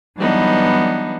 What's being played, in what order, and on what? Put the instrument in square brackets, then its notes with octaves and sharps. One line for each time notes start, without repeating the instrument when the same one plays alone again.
[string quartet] E3 F#3 G3 B3 D4 D#4